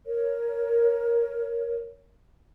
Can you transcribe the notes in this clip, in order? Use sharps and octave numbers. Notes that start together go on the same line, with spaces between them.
A#4 C#5